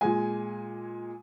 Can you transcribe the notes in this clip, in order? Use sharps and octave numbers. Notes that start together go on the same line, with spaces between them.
A#2 G#3 G#5